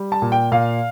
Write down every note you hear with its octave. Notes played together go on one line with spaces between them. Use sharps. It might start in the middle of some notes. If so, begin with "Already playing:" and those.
Already playing: G3
A5
A#2
G5
A#2 F5